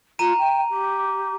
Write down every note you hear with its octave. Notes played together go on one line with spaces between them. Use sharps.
F4 A#5 D#7
G5
G4